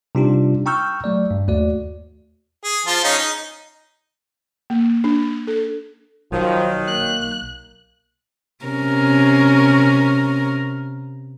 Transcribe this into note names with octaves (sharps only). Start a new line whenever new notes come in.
C3 G3 D4 D#4 F4 G4
G5 A#5 C#6 E6 F6 G6
F#3 A3 D5
G2
D#2 A3 F#4 D5
G#4
F3 F4 A5
C#4 D#4 G#4
D#4
A#3
D4
A4
B1 D#3 F3 F#3
A#3 F#6
C3 C#4 A#4